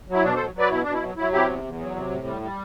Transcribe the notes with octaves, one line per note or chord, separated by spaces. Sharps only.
F#3 E4
B2 D4
F#3 A4 C5
F#3 B4 D5
B2 E4
B2 D4
E4
F#3
F#3 E4
C3 E4 G4
E2
E2
F#3
C3
A2
G3
G3